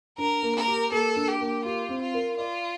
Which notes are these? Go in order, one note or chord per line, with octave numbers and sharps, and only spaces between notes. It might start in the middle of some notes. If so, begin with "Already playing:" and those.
D4 A#4
A#3
A#4
G4
A#3 A4
D4
G4
A#3
F4 G4
C4
F4
A#4
F4 D5